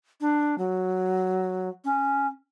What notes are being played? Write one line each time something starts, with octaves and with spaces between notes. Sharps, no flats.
D4
F#3
C#4